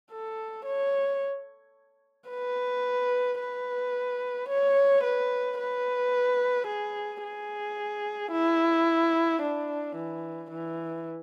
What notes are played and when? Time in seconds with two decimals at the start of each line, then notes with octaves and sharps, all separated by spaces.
0.12 A4
0.65 C#5
2.29 B4
3.40 B4
4.49 C#5
5.03 B4
5.58 B4
6.67 G#4
7.23 G#4
8.32 E4
9.41 D4
9.96 E3
10.50 E3